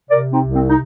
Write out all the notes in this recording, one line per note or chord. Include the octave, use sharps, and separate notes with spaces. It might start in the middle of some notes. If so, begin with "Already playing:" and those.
C3 A#4 D5
C4 D#4
C2
C4
D#4